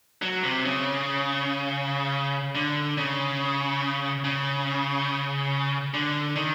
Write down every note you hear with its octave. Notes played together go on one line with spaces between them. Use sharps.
F#3
C3
C#3
D3
C#3
C#3
D3
D#3